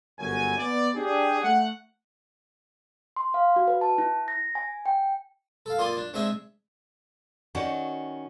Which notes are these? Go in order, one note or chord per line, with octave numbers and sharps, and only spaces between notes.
G1 F#2 G#5
B3 D5
D4 G4 G#4
A3 F#5
C6
F5
F#4
B4
A5
E4
A#6
G#5
G5
A4 F5
A#3 F4 D5 C6 D#6
D4
G#3 C4 D4 D#5 E5 G#5
D#3 C#4 F#4 D5 F#5